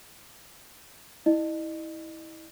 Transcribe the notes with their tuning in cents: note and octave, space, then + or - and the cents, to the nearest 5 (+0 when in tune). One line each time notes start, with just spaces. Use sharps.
E4 -25 D#5 -35